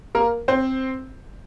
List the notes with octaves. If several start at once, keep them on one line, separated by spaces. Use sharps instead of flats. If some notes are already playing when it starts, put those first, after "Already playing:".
A#3 A#4
C4 C5